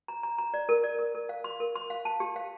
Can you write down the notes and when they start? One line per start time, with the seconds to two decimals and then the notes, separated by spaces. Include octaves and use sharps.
0.08 A#5
0.23 A#5
0.38 A#5
0.54 D5
0.69 A#4
0.84 D5
0.99 A#4
1.15 A#4
1.29 F5
1.44 C6
1.60 A#4
1.76 C6
1.90 F5
2.05 A5
2.20 G4
2.36 F5